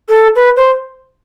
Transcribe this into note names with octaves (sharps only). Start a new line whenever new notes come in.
A4
B4
C5